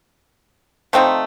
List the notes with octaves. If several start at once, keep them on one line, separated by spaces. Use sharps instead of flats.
F3 A3 C4 D#4